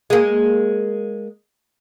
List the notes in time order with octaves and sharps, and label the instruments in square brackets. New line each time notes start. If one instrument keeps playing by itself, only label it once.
[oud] G#3 A#3